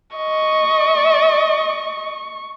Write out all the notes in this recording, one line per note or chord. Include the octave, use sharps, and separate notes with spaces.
D#5 C#6